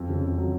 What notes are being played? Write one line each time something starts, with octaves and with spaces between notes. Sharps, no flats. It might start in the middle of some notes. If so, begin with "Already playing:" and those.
Already playing: F2
C#3
F2
F#3